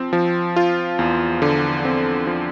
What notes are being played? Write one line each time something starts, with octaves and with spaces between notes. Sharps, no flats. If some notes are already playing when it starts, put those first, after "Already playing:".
Already playing: F3 C4
F3
F4
E2
D3
C4
F3